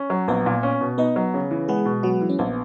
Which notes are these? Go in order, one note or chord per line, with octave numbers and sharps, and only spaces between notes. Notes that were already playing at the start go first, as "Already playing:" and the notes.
Already playing: C#4
F#3
A#1 B3 B4
A#2
C#4
B2
B3 D#4 B4
F#3
C#3
E3
G#3 B3 G#4
B2
F#3 B3 F#4
E3
C#4
A#1 B3